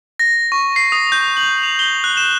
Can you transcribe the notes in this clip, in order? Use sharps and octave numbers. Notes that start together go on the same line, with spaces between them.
A#6
C#6
C7
D#6
G6
F#7
F7
G7
F#6
E7